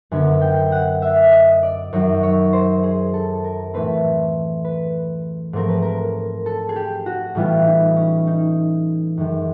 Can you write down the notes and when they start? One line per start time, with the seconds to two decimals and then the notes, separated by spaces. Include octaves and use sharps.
0.11 F#2 D3 F#3 B3 G#5
0.41 G5
0.72 F#5
1.02 E5
1.32 D#5
1.63 D5
1.93 F#2 D#3 F#3 C#5
2.23 C#5
2.53 C5
2.83 G#4
3.14 A4
3.44 A#4
3.74 A2 E3 A3 C4 B4
4.65 B4
5.53 G#2 F3 A3 C4 A#4
5.69 B4
5.82 A#4
6.46 A4
6.69 G#4
6.76 G4
7.06 F#4
7.35 A2 E3 G3 B3 F4
7.67 D#4
7.96 C#4
8.27 D#4
9.17 F#2 D#3 G#3